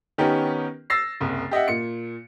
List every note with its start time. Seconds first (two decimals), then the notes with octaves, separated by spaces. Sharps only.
0.18 D#3 B3 C#4 D#4 G4 A#4
0.90 E6 A6 A#6 C7
1.21 F#1 C2
1.51 G4 D#5 E5 F#5
1.68 A#2 C#7